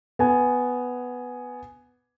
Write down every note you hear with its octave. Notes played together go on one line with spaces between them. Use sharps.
B3 G#5